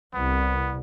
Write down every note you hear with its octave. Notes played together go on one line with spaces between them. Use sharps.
C2 B3